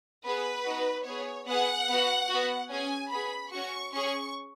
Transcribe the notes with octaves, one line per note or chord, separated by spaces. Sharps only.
B3 G#4 B4
B3 D#4 F#4
B3 G#4 C#5
B3 G#4 F#5
B3 F#4
B3 F#4
C#4 G#4 G#5
B3 G#4 B5
C#4 F#4 C#6
C#4 G#4 C#6